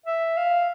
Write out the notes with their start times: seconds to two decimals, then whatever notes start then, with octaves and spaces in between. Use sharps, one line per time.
0.06 E5
0.37 F5